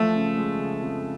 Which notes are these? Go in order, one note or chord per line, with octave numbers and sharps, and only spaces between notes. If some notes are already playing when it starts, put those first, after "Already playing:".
Already playing: F3 A3
C#3
G#3
C#3
F2